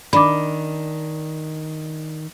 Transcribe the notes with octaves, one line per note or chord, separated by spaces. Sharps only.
D#3 D4 B5 D6